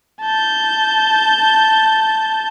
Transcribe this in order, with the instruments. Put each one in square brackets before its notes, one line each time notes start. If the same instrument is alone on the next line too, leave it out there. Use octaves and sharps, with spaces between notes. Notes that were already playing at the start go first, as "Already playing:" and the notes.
[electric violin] A5 G6